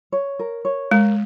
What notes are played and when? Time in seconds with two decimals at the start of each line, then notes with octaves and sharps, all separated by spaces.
0.12 C#5
0.39 A#4
0.65 C#5
0.91 G#3 A#4